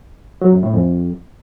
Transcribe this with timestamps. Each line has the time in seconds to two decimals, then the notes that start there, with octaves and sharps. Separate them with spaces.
0.42 F#3
0.52 F#2
0.63 A2
0.74 F2